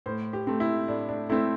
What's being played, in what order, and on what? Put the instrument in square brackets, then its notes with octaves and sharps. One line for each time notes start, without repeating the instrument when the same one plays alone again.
[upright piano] A2 C5
G4
A3 C4
E4
A2 D4
D4
A3 C4 E4